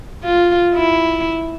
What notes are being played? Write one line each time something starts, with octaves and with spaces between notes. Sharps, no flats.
F4
E4